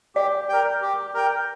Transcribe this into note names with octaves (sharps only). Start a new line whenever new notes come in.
G4 D5
A#4 G5
G4
A#4 G5